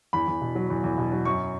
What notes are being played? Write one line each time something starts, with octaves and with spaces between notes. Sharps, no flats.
E2 B5
E2
B2
F#3
E2
E2
B2
F#3
F#2 C#6